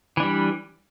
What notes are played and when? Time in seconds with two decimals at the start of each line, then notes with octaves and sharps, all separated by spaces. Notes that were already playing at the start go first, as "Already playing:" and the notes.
0.17 E3
0.20 D4
0.23 G3